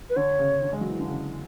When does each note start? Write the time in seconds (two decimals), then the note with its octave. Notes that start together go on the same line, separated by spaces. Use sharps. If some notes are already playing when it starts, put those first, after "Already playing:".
0.10 B4
0.16 D3 C#5
0.39 C#3
0.62 D3
0.73 G#3
0.81 F#3
0.90 E3
0.99 D3
1.08 C#3